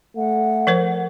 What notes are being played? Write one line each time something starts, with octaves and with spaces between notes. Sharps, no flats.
A3 F#5
F3 A#4 C5